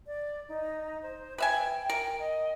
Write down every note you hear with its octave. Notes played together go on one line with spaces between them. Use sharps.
D5
D#4
C5
B4 E5 G5 G#5
A#4
D#5